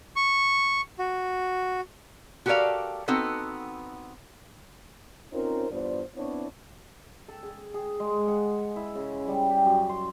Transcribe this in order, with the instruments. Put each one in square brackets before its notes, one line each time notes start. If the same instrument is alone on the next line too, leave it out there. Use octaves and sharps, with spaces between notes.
[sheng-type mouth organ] C#6
F#4
[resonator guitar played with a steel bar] F#4 G4 A4 A#4 D5 F5
B3 C4 D#4 F#4 A4 B4
[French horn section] C4 C#4 D#4 F4 A#4 C5
E2 G2 B3 F4 C5 D5
B3 C4 D4 E4 C#5
[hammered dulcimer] A4
G#4
G#4
G#3
F#5
E4
C#3
G3
G4
F#2
C6